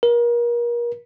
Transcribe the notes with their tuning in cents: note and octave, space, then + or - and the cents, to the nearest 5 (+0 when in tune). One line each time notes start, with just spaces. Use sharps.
A#4 +35